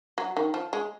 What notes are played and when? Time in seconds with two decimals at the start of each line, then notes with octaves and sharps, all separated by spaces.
0.18 F#3
0.37 D#3
0.54 F3
0.73 G#3